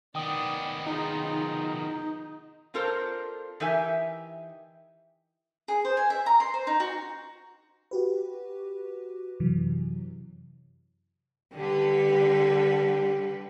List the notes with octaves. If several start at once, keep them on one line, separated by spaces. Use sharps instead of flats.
D#3 B3 D#4 D5 G5 D#6
D#4 F4 G#4
C4 D4 F4 A4 A#4 C5
E3 D#4 G4 A#4 E5 G#5
G#4
C5
G#5
E5
A#5
C6
C5
D#4
F#4
F#4 G4 B4
F#2 C3 E3 F#3
D3 G3 G4 B4